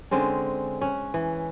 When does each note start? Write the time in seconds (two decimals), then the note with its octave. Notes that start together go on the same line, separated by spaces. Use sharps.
0.11 D3 G#3 C4 C#4
0.81 C#4 F#5
1.14 E3